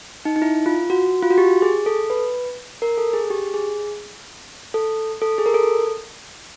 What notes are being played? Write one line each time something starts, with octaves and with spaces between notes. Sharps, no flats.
D#4
D#4
E4
F4
F#4
F4
F#4
G4
G#4
A4
B4
A#4
A4
G#4
G4
G#4
A4
A4
G#4
A#4
A4